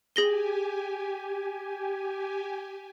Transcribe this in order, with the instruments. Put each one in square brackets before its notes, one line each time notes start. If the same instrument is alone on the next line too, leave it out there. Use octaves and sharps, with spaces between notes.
[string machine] G4 G#5 [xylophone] G#4 A#6 G7